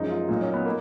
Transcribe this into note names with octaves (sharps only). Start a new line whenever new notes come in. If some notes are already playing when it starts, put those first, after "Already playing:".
Already playing: F#2 F3 G#3 D#4
F4
A#2 F#3 D#4
C#4
B3
A#3